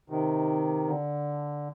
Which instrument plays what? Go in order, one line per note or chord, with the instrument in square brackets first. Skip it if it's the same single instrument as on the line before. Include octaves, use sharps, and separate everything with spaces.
[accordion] C3 D#3
D3